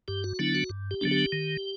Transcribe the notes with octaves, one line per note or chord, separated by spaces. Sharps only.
G2 G4
F#4
D3 F#3 B3 D4 E4
F#4
G2
G4
D3 F#3 B3 D4
G4
D#3